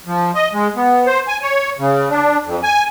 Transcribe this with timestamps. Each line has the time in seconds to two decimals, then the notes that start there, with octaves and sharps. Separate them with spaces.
0.06 F3
0.35 D#5
0.53 G#3
0.76 B3
1.07 C5
1.28 G#5
1.42 C#5
1.79 C#3
2.10 D4
2.45 F2
2.63 G#5